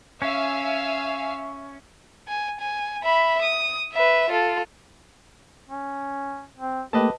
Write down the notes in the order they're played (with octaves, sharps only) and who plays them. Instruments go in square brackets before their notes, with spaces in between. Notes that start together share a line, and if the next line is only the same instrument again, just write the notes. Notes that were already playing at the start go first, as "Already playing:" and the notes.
[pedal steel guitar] C#4 [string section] E5 F5 G#5
[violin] G#5
G#5
E5 B5
D#6
B4 E5
F4 A4
[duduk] C#4
C4
[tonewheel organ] A3 A#3 [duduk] G4 [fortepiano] B4 D#5 A5